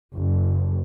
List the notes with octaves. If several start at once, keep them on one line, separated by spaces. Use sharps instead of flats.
F#1